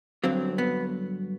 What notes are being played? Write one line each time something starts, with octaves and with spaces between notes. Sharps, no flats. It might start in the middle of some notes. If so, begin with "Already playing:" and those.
G2 D3 F#3 C4
B3